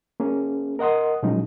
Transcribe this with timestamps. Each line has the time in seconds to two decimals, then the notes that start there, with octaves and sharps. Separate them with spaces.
0.20 A#3 C#4 G#4
0.79 A#4 D#5 F#5 C6 D#6
1.23 A#2 F3 F#3 G#3 C#4 D#4